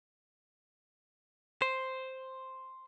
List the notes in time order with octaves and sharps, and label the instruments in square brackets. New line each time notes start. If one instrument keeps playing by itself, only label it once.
[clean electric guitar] C5